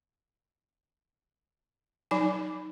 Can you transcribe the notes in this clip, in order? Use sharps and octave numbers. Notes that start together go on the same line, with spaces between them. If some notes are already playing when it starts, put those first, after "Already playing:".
F#3 D#4 G#5